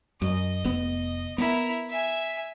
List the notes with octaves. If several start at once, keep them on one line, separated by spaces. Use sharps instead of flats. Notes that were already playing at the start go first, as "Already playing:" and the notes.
F#2 D#5
F1 B3
B3 E4 A#4
E5 G#5